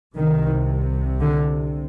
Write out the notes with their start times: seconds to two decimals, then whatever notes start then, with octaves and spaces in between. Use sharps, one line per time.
0.16 C2 C3 D#3
1.20 D3